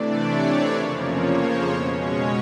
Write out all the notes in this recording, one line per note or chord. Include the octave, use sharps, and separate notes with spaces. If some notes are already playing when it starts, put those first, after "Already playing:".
Already playing: C3 E3 A3 D4 D5
C#5
F2 C#3 F3 A#3 C5
C#5
C5
B2 G#3 C#4 C#5
C#5